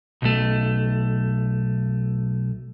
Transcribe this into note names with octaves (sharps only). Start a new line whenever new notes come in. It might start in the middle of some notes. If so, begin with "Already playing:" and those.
B1 A3